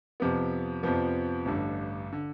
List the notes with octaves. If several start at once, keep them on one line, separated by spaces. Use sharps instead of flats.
F2 C3 F3 B3
F2 C3 F3 B3
A1 G2 D3
D3